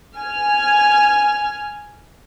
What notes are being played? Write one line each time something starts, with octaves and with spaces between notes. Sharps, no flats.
G#5 F6